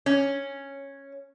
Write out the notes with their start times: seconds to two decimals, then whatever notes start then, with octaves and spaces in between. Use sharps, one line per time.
0.06 C#4